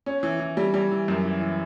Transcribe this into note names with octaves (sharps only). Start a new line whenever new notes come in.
C#4
E3
E3
G3
G3
E3
F#2
E3
E3